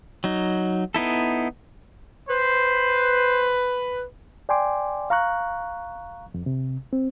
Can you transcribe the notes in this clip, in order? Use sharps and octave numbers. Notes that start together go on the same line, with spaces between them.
F#3 D#4
B3 D#4 E4 A4
B4 C5
D5 G5 G#5 C6 D6
F5 A#5 C#6 F#6
F2
C3
C4